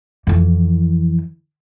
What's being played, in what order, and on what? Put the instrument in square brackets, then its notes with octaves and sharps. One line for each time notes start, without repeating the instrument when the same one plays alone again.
[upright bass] F2 E3